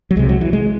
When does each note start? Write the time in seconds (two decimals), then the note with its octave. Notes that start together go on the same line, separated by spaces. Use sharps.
0.11 F#3
0.16 C2 C3 G#3
0.29 F#3
0.41 E3
0.53 G#3